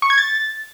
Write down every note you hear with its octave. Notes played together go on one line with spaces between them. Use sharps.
C#6
G#6
A6